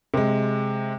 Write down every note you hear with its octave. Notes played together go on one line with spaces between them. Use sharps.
C3 G#3